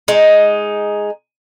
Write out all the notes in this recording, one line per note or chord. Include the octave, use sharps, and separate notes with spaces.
G#3 D#4